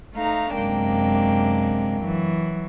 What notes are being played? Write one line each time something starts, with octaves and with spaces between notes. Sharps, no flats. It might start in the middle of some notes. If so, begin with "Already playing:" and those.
A3 D#4 F5 A#5
F#2 C3 G#3 A#3 D4 G5
E3 F#3